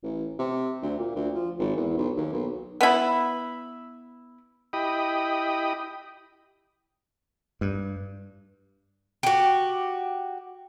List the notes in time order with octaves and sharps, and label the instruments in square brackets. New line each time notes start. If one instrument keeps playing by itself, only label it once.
[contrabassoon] A1
C3
D2
A#2
D2
F3
G#1
E2
B1
D#2
B1
[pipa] B3 E4
[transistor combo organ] E4 G4 D#5 G5 B5 D#6
[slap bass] G2
[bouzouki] F#4 G4